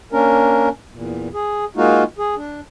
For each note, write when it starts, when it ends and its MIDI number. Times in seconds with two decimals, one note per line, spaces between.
0.12 0.69 58
0.12 0.69 61
0.12 0.69 62
0.12 0.69 70
0.93 1.29 40
0.93 1.29 46
1.34 1.65 68
1.76 2.03 56
1.76 2.03 58
1.76 2.03 63
1.76 2.03 65
1.76 2.03 66
2.18 2.35 68
2.36 2.60 62